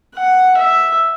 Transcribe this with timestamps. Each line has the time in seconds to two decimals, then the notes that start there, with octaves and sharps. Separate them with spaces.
0.15 F#5
0.58 E5